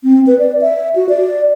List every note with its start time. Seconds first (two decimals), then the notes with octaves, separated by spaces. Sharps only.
0.04 C4
0.27 B4
0.39 D5
0.61 E5
0.96 F#4
1.09 D5